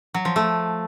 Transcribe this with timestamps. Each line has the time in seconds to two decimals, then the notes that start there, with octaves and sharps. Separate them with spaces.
0.14 F#3
0.25 F3
0.36 A3